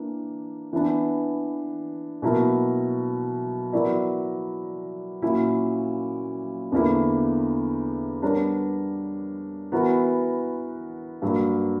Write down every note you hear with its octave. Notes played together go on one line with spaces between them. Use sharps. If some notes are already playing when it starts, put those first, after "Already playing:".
Already playing: E3 A#3 D4
E3 B3 D4
B2 F#3 A#3 E4 A#4
F#3 B3 E4 A#4 D5
A#2 F#3 C#4 E4
E2 D3 A#3 E4
G3 B3 D4 A#4 C#5
E3 B3 F#4 A#4
G2 F#3 A#3